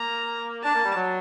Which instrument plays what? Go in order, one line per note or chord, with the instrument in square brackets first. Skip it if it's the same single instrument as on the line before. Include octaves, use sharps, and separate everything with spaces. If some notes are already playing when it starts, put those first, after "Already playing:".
Already playing: [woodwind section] A#3 [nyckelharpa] A#5
[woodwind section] D4 [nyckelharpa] A5
[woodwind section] A#3
G3
F#3